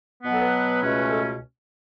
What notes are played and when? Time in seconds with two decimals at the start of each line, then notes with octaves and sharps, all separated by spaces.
0.23 B2 F#3 B3
0.33 A4
0.42 B4
0.81 C#2 B2 A3 C#4
1.11 A4